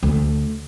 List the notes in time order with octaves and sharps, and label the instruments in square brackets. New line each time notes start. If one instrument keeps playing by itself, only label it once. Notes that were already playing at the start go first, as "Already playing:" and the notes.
[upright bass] D2